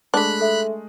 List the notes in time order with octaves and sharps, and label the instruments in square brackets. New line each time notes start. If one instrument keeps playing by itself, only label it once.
[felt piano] G#3 A3 [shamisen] D4 [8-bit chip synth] B5 F#6
[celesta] A4 E5